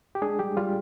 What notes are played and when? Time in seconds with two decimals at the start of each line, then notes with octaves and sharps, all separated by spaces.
0.15 G4
0.22 G#3 D4 G#4
0.39 G3 G4
0.57 G3 F4